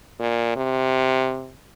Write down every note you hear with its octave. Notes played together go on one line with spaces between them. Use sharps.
A#2
C3